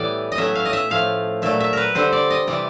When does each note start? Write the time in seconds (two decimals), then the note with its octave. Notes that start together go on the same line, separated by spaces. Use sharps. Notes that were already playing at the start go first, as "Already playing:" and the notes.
Already playing: A2 E3 G3 B3 D5
0.32 D#5
0.38 A2 F#3 A3 C#4 E5
0.55 F5
0.65 D#5
0.73 E5
0.90 A2 F3 A3 F5
1.42 A#2 F#3 A3 E5
1.60 E5
1.73 A#4 B4
1.95 D3 G3 C4 C5
2.13 D5
2.31 D#5
2.47 C3 E3 G3 D5